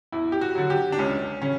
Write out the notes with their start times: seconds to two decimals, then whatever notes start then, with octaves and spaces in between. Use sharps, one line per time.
0.12 E2 E4
0.32 G4
0.41 F#4
0.55 D3 F#3
0.70 G4
0.92 D4
0.98 C#2 C#4
1.42 C#3 C#4